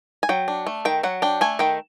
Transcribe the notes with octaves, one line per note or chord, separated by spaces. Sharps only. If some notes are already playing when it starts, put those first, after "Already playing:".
G#5
F#3 G5
D4
A3
D#3 G5
F#3 F#5
D4 G5
A3 G#5
D#3 G5